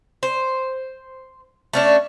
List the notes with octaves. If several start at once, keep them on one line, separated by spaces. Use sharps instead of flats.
C5
A3 C#4 D4